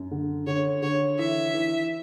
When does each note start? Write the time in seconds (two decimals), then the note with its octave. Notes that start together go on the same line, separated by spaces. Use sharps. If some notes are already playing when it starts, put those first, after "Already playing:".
Already playing: F#2
0.11 D3
0.47 D3 C#5
0.82 D3 C#5
1.19 E3 E5
1.54 E3